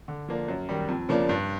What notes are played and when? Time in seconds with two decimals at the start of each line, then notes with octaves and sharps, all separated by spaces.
0.08 D3
0.28 F3 A#3 D4
0.48 F#2
0.69 D#3 G3
0.89 F2
1.09 C#3 F3 A#3 D4
1.29 G2